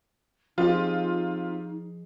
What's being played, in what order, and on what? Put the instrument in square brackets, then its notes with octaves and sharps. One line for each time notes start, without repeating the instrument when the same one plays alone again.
[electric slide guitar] F3 G#4 D#5 [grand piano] C4 G4 [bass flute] D#4 [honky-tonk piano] F4